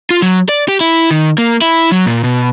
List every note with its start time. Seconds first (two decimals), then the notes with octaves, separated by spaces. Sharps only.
0.10 F4
0.22 F#3
0.49 D5
0.68 G4
0.81 E4
1.11 D#3
1.38 A#3
1.62 E4
1.92 F#3
2.06 A#2
2.24 B2